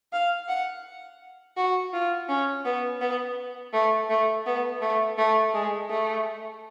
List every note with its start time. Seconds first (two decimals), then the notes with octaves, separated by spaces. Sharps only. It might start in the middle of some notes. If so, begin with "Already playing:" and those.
0.13 F5
0.48 F#5
1.57 F#4
1.93 F4
2.29 C#4
2.65 B3
3.01 B3
3.73 A3
4.10 A3
4.46 B3
4.81 A3
5.18 A3
5.54 G#3
5.90 A3